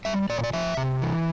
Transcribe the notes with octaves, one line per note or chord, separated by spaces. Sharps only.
G3 E5
A#2 D5
C#5
D5
F3 E5
C3
E3